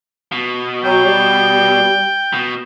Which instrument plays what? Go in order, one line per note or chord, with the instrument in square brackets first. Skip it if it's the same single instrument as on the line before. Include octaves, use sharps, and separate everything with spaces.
[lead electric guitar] B2
[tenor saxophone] F#3 [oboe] G5
[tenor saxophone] G3
[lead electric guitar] B2